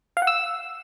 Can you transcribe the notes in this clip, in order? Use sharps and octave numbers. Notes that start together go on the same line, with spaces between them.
F5
F#5
E6